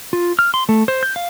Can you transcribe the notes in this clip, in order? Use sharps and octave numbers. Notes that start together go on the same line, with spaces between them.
F4
F6
C6
A3
C5
G6
F5